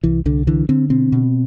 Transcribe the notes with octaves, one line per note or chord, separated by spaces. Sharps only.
C2 E3
C2 D3
D3 E3
D3 C4
B2 C4
B2